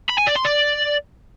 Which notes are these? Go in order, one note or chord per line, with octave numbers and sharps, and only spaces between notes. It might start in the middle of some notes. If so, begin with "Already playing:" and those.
B5
G#5
D5
C6
D5